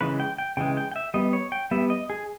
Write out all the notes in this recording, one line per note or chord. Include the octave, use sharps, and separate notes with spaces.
C#3 E3 G#3 B4
G5
G5
C#3 E3 G#3 G5
G5
G5
E5
G3 B3 D#5
C#5
G5
G3 B3 E5
D#5
G#4